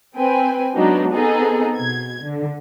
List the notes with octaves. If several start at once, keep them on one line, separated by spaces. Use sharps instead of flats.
C4 B4 G5 G#5
F#3 G#3 B3 D4 D#4
B3 C4 D#4 G#4 A4
B2 G#6
D3